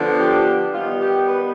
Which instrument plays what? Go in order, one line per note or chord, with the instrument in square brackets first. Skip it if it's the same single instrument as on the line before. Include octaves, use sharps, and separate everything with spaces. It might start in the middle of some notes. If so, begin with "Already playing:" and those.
Already playing: [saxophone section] D3 F3 B3 D4
G4
D#3 G3 B3 F4
G4
B4